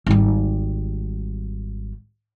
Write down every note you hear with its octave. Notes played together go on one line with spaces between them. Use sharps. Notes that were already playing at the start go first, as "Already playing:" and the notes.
G#1 G3